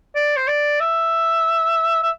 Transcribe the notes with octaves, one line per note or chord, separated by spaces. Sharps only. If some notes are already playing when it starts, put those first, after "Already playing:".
D5
C5
D5
E5
E5